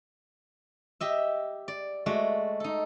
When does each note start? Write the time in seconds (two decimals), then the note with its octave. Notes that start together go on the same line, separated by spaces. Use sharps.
1.01 G4 D#5 E5
1.68 D5
2.06 G#3 A3 F#4 D5
2.60 D#4 A4